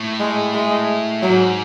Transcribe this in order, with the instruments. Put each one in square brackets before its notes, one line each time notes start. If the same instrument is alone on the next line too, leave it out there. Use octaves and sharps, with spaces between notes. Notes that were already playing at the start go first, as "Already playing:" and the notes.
Already playing: [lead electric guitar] A2
[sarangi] G#3
G#3
[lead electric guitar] G#2 [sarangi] F#3